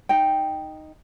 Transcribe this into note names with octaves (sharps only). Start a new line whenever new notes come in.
D#4 G5